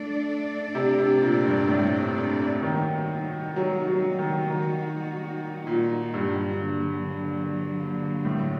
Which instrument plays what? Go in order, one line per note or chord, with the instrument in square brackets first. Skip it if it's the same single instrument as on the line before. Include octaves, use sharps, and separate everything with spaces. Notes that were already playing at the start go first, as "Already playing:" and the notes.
Already playing: [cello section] A3 D4 A4 D5
[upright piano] C3
C3
A#2
G2
A2
[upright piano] D#3 [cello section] G3 A#3 D#4 F#4
[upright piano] F#3
F#3
D#3
D#3
A#2
G2
[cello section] D3 F#3 A#3
[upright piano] A2